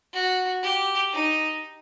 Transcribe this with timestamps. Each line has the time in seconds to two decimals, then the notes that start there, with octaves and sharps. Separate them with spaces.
0.13 F#4
0.62 G4
1.12 D#4